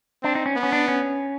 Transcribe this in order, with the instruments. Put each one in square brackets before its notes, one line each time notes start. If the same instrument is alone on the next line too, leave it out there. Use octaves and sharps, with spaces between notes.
[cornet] C4 [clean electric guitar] D4
[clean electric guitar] D#4
C#4
[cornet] B3
[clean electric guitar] C#4
D4
C#4